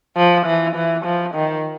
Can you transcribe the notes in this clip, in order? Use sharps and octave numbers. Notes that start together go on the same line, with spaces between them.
F3
E3
E3
F3
D#3